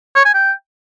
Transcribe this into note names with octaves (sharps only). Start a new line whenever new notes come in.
C#5
G#5
G5